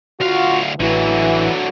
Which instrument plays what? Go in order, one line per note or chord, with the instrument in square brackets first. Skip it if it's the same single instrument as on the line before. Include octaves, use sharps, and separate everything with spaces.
[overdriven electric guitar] D2 F5 [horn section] F4 F#4
[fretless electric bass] A1 [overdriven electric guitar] D3 F#3 [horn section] E3